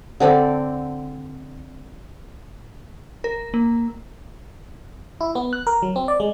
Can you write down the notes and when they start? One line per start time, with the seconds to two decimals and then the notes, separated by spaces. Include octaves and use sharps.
0.20 D3 C4 A4 D5
3.24 A#4
3.54 A#3
5.21 E4
5.35 B3
5.53 F#6
5.67 A#4
5.82 F#3
5.96 C4
6.08 D5
6.20 G#3